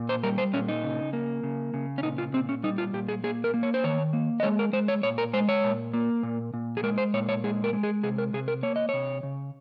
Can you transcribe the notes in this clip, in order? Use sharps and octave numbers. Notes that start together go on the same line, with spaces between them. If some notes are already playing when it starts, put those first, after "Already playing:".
Already playing: A#2
C5
G3 A#4
C5
A#2 C#4
D#4
C#3
A#3
C#3
C#3
C#4
A#2 D#4
F4
A#2 C4
C#4
G3 D#4
F4
A#2 G4
G#4
A#3 G#4
A#4
A#3
C#5
C5
D#3 C#5
A#3
D#5
G#3 C#5
A#4
G#3 C5
C#5
A#2 C#5
A#4
G#3 C5
C#5
A#2
A#3
A#2
A#2
G#4
G#3 A#4
C5
A#2 C#5
C#5
G#3 G#4
A#4
G#3
G#4
C3 G#4
A#4
C3 G#4
A#4
A#3 C#5
D#5
C3 C#5
C#3